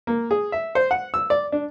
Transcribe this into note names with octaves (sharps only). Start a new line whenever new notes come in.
A#3
G#4
E5
C5
F#5
E6
D5
D4